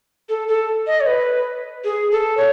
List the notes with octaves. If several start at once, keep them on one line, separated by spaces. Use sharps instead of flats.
A4
A4
D#5
C#5
B4
G#4
A4
C#5